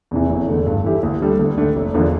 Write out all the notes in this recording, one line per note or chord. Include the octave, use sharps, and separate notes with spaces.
E2 C3 E3
F1
E2 D3 A3
G2
E3 A3 E4 G4
D2
D3 G3 D4 A4
D2
D3 A3 D4
F1
E2 D3 F3 A#3